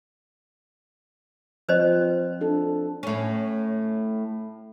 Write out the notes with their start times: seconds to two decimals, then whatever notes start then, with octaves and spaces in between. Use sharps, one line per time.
1.69 F3 C4 B4 C5 D#5
2.41 D4 A4
3.03 A2 C#4